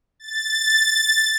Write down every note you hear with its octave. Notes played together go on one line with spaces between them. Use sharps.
A6